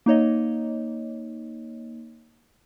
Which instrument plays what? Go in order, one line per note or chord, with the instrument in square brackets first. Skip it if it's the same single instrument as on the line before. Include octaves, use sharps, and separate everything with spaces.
[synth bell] A#3 D#4 C#5 D#5